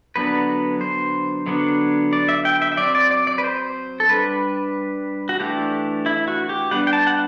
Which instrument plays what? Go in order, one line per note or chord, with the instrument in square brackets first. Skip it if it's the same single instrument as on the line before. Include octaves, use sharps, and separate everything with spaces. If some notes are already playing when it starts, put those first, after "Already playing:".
[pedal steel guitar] D3 F#3 B3 D4 B4
C5
D3 F#3 B3 D4
D5
E5
G5
E5
E5
F#3 C4 D5
D5
D5
D5
B4
C5
A4
G3 D4 B4
F#4
E3 A3 D4 G4
E4
F#4
G4
G3 B3 D4 F#5
G5
A5
F#5